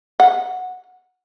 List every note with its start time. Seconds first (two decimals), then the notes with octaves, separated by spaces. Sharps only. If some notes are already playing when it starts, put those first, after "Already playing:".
0.20 F#5